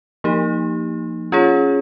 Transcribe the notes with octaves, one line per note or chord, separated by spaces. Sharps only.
F3 A#3 D#4 G4
C#4 F4 G#4 C#5